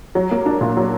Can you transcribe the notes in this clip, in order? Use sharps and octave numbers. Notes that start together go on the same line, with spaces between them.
F#3
A#3
D4
A#2
F#3